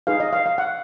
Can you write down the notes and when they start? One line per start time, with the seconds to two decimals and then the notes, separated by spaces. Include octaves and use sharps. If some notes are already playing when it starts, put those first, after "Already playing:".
0.07 D#4 G#4 B4 F5
0.20 D#5
0.33 F5
0.46 F5
0.58 F#5